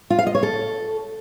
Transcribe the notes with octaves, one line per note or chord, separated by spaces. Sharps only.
F4
F5
D#5
C#5
A4